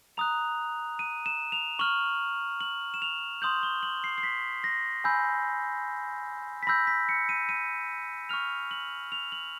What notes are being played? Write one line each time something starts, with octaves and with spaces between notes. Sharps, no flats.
A#5 D#6 F#6 F7
D#7
E7
F7
C#6 F6 F#7
F#7
E7
F7
C6 D#6 G6 F#7
G7
F#7
C7
C7
B6
A#6
G#5 B5 E6 G6
B6
B5 E6 G6 A#6
B6
C#7
D#7
D#7
C#6 F6 F7
F#7
F7
F#7